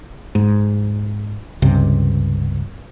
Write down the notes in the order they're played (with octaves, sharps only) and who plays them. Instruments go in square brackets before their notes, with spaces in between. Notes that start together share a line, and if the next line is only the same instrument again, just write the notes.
[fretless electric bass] G#2
C#2 G2 C3